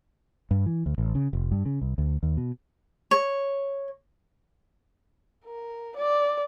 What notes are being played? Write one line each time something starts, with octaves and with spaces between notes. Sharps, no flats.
G2
E3
D2
A1
C#3
F1
G2
C#3
C2
D2
D#2
B2
C#5
A#4
D5